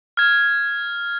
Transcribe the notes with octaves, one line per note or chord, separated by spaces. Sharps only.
F6 G#6